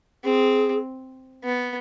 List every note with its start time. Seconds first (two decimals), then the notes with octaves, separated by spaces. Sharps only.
0.24 C4 G#4
1.44 B3